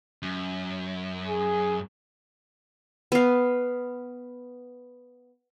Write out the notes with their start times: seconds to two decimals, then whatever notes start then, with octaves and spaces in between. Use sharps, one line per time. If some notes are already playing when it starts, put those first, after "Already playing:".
0.22 F#2
1.26 G#4
3.12 B3 F5